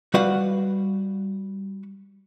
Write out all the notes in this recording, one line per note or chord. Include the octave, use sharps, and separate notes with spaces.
G3 F#4 B4 F5 F#5